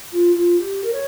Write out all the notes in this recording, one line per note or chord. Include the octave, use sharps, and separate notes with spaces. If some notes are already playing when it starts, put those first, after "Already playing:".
F4
F4
G4
A#4
C#5